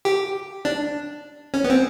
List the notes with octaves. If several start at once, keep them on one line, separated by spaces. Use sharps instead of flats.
G4
D4
C#4
B3
C4